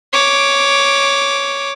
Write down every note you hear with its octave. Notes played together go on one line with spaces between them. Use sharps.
C#5 D6